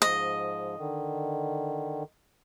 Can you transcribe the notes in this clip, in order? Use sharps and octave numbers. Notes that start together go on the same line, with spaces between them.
G#2 F3 D#5
D3 D#3